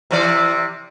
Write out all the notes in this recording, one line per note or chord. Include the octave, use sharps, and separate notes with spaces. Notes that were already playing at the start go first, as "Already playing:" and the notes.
C3 E3 D5